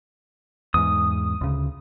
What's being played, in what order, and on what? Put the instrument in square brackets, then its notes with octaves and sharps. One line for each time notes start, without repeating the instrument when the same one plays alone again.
[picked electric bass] E2 G#2 [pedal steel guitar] D#6
[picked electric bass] D2 C#3